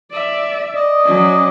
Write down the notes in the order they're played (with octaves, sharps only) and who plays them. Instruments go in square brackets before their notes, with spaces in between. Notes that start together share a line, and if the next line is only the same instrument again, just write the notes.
[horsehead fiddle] D5 E5
[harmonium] D5 D#5
[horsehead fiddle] F#3 C#4